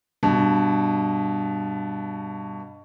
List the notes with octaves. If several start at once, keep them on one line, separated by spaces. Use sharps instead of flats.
G2 B2